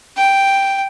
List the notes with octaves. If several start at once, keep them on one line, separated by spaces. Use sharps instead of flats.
G5